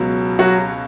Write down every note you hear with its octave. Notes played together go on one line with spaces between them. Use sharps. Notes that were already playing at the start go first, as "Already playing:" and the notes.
Already playing: C#2 B2 F#3
F#3 F#4